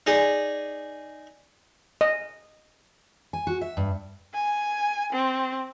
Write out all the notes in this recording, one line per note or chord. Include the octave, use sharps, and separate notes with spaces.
D#4 G#4 D5
D#5
G#5
F#4
E5
G2
G#5
C4